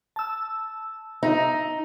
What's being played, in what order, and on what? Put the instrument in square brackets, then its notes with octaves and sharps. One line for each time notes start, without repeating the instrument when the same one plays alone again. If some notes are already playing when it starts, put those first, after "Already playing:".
[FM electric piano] A5 E6
[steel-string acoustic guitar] D#4